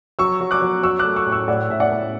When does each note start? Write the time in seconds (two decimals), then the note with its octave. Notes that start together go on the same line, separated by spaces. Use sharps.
0.19 F#3 C#6 E6
0.41 F#3
0.51 D6 F#6
0.62 F#3
0.83 F#3 C#6 E6
0.99 D6 F#6
1.04 A3
1.16 C#6 E6
1.27 A2
1.32 C#6 E6
1.48 A2 D5 F#5
1.70 A2 E5
1.80 D5 F#5
1.91 A2